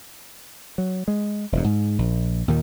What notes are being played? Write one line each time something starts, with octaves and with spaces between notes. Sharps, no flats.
F#3
G#3
E1 G2
G#2
A#1
D#2 A#2 D#3